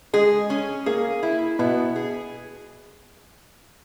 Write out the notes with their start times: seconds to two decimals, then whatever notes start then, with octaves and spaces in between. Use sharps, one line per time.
0.13 G#3 G#4
0.50 C#4
0.86 A#3 G#4
1.23 E4
1.59 B2 B3 E4
1.96 G#4